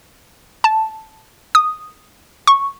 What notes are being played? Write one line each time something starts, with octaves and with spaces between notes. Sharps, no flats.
A5
D#6
C#6